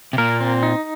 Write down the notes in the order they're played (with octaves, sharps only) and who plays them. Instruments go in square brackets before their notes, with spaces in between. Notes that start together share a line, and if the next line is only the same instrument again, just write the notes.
[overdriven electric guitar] C3
[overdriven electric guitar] A#2 [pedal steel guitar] A#4
[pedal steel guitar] C4
D#4